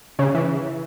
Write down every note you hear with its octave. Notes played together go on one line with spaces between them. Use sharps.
C#3
E3